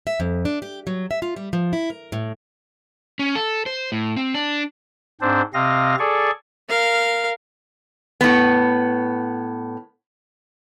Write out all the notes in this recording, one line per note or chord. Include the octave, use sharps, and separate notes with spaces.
E5
F2
D4
G4
F#3
E5
F4
G3
F3
E4
A#4
A2
C#4
A4
C5
A2
C4
D4
G#2 C4 D4 C5
C3 C4 D#5 F5 A#6
G#4 A4 D5 C#6
A#4 F5
A2 B3